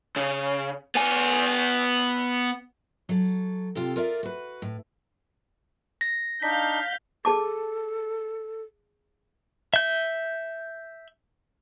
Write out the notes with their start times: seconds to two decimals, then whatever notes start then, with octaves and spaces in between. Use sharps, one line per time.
0.16 C#3
0.95 B3 G#5
3.09 F#3 A4
3.75 C3 F4 G4 A4
3.96 F4 A#4 D5 E5
4.23 F#4 B4
4.62 A2
6.01 A#6
6.42 D4 D#4 F5 G6 B6
7.25 G#4 A4 A5 D6
9.74 E5 G6